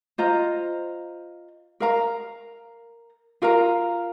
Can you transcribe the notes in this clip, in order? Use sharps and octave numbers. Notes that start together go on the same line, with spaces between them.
F4 C5 D#5 A#5
A#4 F5 A#5
F4 A#4 F5 A#5